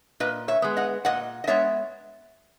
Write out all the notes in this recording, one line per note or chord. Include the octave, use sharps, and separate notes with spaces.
A#2 B4 D#5
C#5 E5
G#3 B3
D#5 F#5
A#2 D#5 F#5
D#5
G#3 B3 C#5 E5